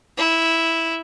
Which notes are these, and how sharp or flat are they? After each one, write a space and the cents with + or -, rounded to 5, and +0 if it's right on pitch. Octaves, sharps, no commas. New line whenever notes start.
E4 -5